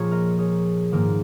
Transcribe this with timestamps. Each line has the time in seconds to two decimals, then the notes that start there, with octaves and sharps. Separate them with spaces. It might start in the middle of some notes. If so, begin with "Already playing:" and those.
Already playing: A#2 F3 A#3 F4 G#4 C#5
0.11 A#4 D#5
0.39 G#4 C#5
0.92 G#2 D#3 A#3